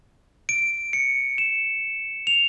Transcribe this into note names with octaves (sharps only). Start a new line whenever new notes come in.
D7
C#7
E7
F7